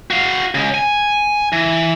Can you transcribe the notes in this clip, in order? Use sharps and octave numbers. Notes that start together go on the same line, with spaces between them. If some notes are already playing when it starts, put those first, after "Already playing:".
F#4 F5
C#3 G#3
G#5
E3